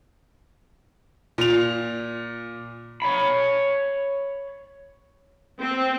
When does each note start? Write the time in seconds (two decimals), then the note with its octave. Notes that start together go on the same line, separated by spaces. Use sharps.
1.38 A#2 F7
3.02 C#5 B5
5.61 C4